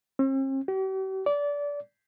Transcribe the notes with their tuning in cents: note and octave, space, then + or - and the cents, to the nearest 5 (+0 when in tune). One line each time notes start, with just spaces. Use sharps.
C4 +45
G4 -45
D5 -25